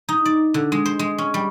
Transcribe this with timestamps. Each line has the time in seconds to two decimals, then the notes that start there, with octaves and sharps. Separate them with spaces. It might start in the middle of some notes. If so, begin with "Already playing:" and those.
0.09 D#4
0.25 D5
0.54 D3
0.72 G#3
0.85 C5
0.99 G#3
1.18 C#4
1.34 G3